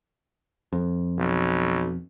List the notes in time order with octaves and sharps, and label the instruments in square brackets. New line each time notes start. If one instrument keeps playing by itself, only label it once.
[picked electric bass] F2
[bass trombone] B1